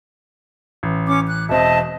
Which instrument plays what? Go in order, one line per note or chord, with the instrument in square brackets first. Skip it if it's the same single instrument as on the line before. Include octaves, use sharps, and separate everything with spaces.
[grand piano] A1
[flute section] C#4 D6
F#6
[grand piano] E1 C4 [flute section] D#5 E5 A5